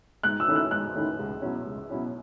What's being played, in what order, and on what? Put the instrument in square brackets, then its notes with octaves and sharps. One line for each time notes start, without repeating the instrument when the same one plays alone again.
[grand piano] G#2 [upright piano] F#6
[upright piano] E6
[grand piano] D#3 A3 C#4 E4
[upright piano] F#6
[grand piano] G#2 [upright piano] F#6
[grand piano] D#3 A3 C#4 E4
C#2
B2 F#3 C#4 E4
C#2
B2 F#3 C#4 E4